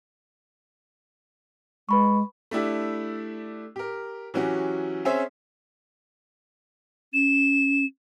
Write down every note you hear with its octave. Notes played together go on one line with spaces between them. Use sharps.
G#3 B4 B5 C#6
A3 D4 E4 G4
G4 A#4
E3 F#3 C#4 F#4 G4
C4 C#4 G#4 C5 C#5 E5
C#4 E7